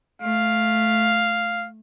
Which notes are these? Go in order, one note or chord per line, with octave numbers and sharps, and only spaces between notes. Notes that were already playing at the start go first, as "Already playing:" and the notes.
A3 F5